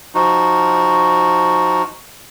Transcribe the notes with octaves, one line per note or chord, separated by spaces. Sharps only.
F3 D#4 F#4